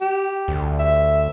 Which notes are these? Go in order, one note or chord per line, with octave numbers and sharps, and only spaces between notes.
G4
D2
E5